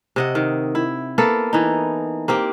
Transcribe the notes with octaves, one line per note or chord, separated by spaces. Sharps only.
C3 D#5 F#5
D#3
E4
A#3 B3 A4
E3 D#4
A#3 C4 G4